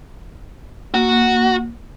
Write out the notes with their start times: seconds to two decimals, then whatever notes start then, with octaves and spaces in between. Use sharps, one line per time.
0.94 A#3 F#4